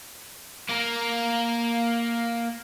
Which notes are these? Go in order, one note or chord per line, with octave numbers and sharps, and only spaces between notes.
A#3 A#4